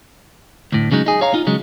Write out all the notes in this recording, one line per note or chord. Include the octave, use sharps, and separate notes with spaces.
D2 A2
C#3 F#3 G#3 D#4
D#4 G#4
C#5 F5 A#5
D#4 F4
C#3 F#3 G#3